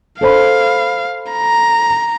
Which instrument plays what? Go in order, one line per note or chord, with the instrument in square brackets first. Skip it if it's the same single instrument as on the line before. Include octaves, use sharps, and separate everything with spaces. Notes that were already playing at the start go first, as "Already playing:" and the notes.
[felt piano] A4 C5 B5 [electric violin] F5
[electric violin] A#5